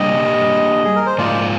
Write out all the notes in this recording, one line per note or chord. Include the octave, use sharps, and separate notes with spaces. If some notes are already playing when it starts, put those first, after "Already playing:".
Already playing: G3 A#3 D4 G4 D#5
G#4
A#4
C5
G#2 F3 A#3 F4 D5